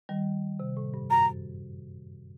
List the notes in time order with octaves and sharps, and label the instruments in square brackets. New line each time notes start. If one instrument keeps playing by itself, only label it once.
[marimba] D#3 G3
C3
A2
G2
[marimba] F#2 [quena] A#5